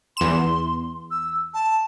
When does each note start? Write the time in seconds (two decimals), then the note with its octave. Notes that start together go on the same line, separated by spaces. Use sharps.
0.17 E2 C6 E7
1.11 E6
1.54 A5